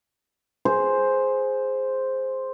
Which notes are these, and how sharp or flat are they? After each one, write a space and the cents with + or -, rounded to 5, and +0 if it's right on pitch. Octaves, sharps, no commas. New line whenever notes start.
G#4 +5 C5 +0